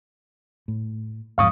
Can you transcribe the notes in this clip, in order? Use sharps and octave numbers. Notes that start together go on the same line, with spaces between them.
A2
E2 G#2 F3 F5 C#6 D#6